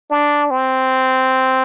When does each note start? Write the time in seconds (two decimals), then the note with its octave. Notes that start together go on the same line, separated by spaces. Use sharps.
0.11 D4
0.50 C4